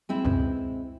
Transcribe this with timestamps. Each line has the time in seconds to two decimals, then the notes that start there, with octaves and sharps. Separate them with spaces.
0.09 G#3 C4 E4
0.25 C#2 F#2 B2